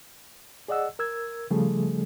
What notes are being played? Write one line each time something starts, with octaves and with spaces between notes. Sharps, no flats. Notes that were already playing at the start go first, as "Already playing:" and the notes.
G#4 D5 D#5 F#5 E6
A#4 E6 G#6
C#3 F3 G3 A3 G#4 A4